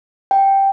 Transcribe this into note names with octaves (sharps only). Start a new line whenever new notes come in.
G5